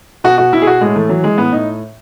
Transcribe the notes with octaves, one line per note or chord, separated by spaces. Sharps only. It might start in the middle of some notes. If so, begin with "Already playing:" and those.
B2 F#4
B2 F#4
B2 E4
G#4
B2 F#4
A2 G#3
E3 A3
E3 F#3
E3 G#3
A2 B3
A2 D#4